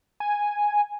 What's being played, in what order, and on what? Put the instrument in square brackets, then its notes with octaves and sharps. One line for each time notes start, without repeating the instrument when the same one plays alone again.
[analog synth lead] G#5